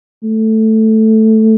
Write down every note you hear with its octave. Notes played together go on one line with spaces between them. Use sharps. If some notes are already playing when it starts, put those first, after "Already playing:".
A3